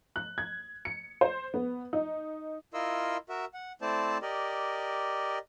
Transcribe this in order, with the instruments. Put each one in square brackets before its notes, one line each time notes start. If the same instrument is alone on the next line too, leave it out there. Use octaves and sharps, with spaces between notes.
[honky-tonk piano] F#6
G#6
C#7
C5
B3
D#4
[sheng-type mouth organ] E4 F4 A#4 D#5 C6 E6
F#4 A#4 E5
F#5
A3 C4 E4 C5 D5 A5
G4 A#4 D5 D#5